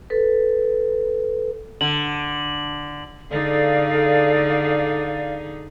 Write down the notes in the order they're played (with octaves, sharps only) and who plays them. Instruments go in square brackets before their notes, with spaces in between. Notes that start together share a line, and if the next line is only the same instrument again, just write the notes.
[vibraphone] A4 B4
[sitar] D3 [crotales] F#7
[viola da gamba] D3 D#4 G#4 [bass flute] A4 [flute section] D5 F5